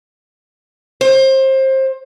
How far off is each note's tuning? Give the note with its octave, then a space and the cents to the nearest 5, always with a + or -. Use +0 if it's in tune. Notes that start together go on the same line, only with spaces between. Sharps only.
C5 +25